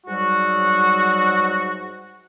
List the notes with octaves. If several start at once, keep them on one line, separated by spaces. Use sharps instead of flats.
G#2 F#3 G3 F#4